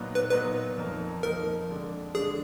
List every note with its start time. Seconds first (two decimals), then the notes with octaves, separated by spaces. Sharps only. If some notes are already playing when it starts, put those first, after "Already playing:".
Already playing: A#2 F#3 B3 D#4
0.15 B4
0.31 A#2 F#3 B3 D#4 B4
0.77 F2 F3 A#3 D#4
1.23 F2 F3 A#3 D#4 A#4
1.69 F2 D3 G#3 D4
2.15 F2 D3 G#3 D4 G#4